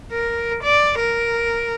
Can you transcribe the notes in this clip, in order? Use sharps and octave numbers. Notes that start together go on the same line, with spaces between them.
A#4
D5
A#4